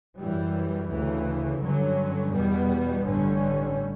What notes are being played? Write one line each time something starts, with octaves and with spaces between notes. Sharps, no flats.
F#2 E3 G3
D2 C#3 E3
G2 D3 F#3 C#4
E2 B2 G3 B3
A1 G2 D3 G3 C#4